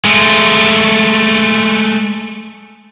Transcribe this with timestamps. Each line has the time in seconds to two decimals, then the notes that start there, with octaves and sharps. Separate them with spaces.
0.05 G#3 A3